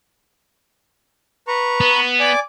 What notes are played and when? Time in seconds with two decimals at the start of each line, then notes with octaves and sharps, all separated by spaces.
1.48 B4 A#5 C#6
1.80 B3
2.20 D5 G#5 D6